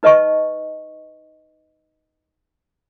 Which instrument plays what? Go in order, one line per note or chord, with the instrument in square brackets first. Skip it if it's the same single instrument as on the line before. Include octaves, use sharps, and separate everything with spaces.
[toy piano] D#4 B4 D#5 A5 C#6